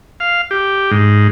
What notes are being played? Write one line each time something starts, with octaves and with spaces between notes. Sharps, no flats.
F5
G4
G#2